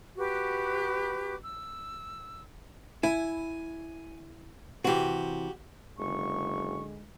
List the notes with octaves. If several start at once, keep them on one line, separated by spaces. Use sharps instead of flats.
F#4 G4 B4 D6
E6
E4 G#5
C3 E3 F#4 G4
F#1 D3 G#3 C#6